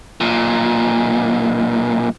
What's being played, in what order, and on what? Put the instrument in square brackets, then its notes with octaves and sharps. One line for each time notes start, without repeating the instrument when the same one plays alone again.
[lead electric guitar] B1 A#2